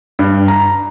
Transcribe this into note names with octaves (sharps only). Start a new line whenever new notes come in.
G2
A#5